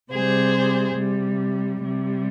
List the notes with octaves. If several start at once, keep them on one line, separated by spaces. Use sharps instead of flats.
C3 G3 G#4 C5
C3 G3
C3 G3